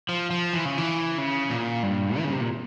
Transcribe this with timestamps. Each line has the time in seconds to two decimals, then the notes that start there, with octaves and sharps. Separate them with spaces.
0.09 F3
0.31 F3
0.53 E3
0.65 C#3
0.78 E3
1.18 C#3
1.50 A#2
1.83 G2
2.18 E3
2.24 C#3
2.32 C3
2.41 A#2